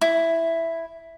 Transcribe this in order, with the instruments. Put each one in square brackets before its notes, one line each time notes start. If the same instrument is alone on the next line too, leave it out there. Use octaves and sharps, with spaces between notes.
[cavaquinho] E4